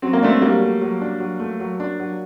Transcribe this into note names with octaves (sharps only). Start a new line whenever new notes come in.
F#3 C4
A#3
A3 C4 D4
F#3 G3 A#3
A3
F#3
D4
F#3
A3
F#3
D4
F#3